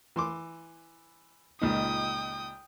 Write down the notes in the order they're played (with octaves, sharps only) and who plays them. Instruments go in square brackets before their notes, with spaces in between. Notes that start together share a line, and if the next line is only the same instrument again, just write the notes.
[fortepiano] E3 C6 D6
[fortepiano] C#2 A#2 D#4 [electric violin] G5 D#6